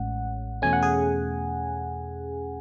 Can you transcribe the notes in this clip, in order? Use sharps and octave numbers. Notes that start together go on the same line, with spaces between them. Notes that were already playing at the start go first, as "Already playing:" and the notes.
Already playing: A1 A2 G#3 C#4 F#5
E2 B2 A3 C#4 G#5
F#5
G#4 G#5